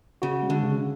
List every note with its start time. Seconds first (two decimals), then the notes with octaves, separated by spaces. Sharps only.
0.22 C#3 F#4
0.43 G#3
0.50 D3
0.63 C#3